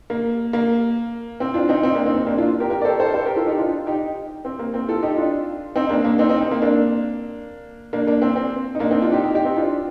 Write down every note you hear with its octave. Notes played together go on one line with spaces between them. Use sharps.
A#3
A#3
C4
D4 F4
C4 D#4
C4
A#3 D4
C4 D#4
C4
A#3 D4
D4 F4
G4 A#4
G4 A#4
D5
A4 C5
A4 C5
A4 C5
G4 A#4
F4 A4
D#4 G4
D4 F4
D#4 G4
C4
A#3
C4
F4 A4
D#4 G4
D4 F4
C4 D#4
D#4
A#3 D4
A#3 D4
C4 D#4
C4 D#4
C4
A#3
A#3 D4
A#3 D4
A#3 D4
C4
C4
D#4
A#3 D4
C4 D#4
D4 F4
D#4 G4
D#4 G4
D#4 G4
C4 D#4
D4 F4